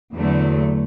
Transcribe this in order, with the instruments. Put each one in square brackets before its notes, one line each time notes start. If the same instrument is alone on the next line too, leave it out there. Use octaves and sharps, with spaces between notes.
[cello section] E2 D3 F#3 A3